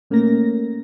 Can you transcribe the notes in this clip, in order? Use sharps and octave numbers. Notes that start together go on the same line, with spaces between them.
A#2 A3 A#3 C#4 A#4 A#6